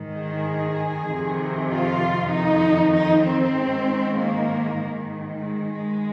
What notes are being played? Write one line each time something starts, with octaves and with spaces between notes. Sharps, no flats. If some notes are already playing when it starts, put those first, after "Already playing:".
Already playing: G#2 D#3
G#4
F2 C3 D#3
F4
F2 D#3 D#4
D#4
C4
G#2 D#3
A#3
G#2 D#3
G#3
G#3